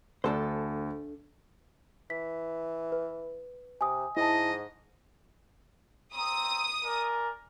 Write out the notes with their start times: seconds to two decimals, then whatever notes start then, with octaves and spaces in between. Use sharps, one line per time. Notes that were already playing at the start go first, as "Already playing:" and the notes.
0.24 D2 D4 A4 C5
2.10 E3 B6
2.92 B4
3.81 C3 G#5 D#6
4.17 G#2 E4 D#5 A5
6.14 C4 A#5 D#6
6.85 A#4 D5 G#5